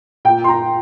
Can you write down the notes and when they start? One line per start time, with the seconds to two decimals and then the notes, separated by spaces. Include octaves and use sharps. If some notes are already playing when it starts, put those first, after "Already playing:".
0.25 A#2 A#3 G5
0.44 C6
0.48 A#5